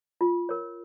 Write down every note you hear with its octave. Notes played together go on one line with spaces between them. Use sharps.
F4
A#4 C#5